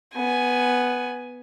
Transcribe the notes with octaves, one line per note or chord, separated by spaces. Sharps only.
B3 G#5